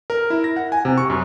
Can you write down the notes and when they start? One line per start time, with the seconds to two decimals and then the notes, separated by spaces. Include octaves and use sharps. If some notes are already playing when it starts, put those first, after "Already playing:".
0.10 A#4
0.30 E4
0.44 A#6
0.56 F#5
0.72 G#5
0.85 C3
0.98 C#6
1.10 F#2